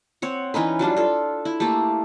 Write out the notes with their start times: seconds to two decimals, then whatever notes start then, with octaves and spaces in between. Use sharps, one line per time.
0.22 C4 C#5 F#5
0.54 E3 C#4 D#4 B4
0.79 F#3 G3 D4 F4
0.96 F4 A4
1.45 E4
1.60 A3 A#3 G4 A4